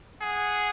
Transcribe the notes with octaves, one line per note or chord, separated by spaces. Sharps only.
G#4 F#5